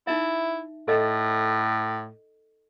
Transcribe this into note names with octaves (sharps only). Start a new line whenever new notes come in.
D#4 E4 E5
A2 A4 D#5